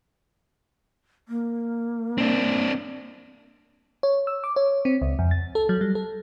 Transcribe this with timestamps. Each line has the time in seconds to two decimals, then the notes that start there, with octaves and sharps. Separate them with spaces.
1.28 A#3
2.18 C4 D4
4.03 C#5
4.27 E6
4.44 D6
4.56 C#5
4.85 C4
5.02 C#2
5.19 F2
5.31 A6
5.55 A4
5.69 F#3
5.81 G3
5.95 A4